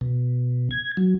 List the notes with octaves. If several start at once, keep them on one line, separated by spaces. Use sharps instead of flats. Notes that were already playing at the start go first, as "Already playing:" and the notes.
B2
G#6
F#3